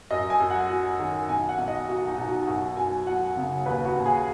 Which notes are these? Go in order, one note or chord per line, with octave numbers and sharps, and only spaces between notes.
F#2 D#5
G#5
F#2
F#5
F#3
D#3
B1 G#5
F#5
B1
D#5
F#3 F#4
D#4
B2
F#4
F#2 F#4
F#2 G#5
F#3 F#5
C#3
D#2 B4
F#4
D#2
G#4